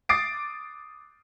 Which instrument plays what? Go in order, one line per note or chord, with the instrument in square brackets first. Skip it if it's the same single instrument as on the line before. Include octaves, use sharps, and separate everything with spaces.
[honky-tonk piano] D6 D#6 A6 C7 D7